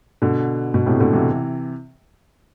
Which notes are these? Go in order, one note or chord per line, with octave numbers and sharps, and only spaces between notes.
B2 D3
B2
A2 C3
B2 D3
C3 E3